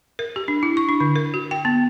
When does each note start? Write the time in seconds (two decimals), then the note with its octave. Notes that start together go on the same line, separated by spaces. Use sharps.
0.19 A#4
0.36 G4
0.48 D4
0.63 E4
0.77 C#6
0.89 D4
1.00 D3
1.16 A#4
1.34 F#4
1.51 G5
1.65 B3